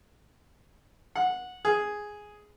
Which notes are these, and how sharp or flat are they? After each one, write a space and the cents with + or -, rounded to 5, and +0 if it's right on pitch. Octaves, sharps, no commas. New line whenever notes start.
F#5 -15
G#4 +0